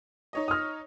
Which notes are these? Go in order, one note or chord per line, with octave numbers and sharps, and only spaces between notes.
D#4 C#5 D#5
D#6 F6